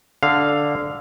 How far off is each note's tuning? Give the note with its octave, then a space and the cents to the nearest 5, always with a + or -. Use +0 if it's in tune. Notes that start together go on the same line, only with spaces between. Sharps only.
D3 +0 F5 +0